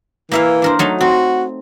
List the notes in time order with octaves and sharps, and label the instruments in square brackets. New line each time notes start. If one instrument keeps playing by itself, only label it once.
[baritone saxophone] E3 [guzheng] A#3 E5 F5
[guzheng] D4 A#4 C5
F#3 A3 D#4
[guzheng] C4 [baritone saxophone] F#4